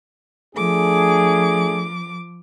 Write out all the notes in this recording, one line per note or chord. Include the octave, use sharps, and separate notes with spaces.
F3 A3 D4 G#4 D6